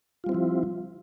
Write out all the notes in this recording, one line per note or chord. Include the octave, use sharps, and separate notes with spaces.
F3 G3 C4 E4 F4